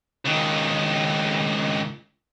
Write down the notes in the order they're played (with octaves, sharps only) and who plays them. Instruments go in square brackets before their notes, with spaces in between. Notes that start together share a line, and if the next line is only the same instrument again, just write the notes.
[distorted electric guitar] C#2 D#3